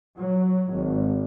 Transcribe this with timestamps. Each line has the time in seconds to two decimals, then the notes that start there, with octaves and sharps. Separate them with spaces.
0.17 F#3
0.71 G#1